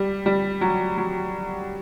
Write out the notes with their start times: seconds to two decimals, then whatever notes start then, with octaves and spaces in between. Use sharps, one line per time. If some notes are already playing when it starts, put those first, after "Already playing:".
Already playing: G3
0.26 G3
0.61 F#3
0.98 F#3